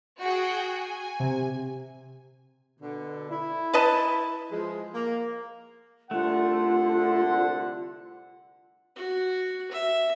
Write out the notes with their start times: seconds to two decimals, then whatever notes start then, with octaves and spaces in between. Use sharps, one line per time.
0.21 F#4 G#4 G5
0.78 G#5
1.20 C3
2.80 B2 D3
3.30 E4
3.73 B4 D#5 A5
4.50 F3 G#3
4.93 A#3
6.11 C2 D3 A3 F4 F#5
8.96 F#4
9.71 E5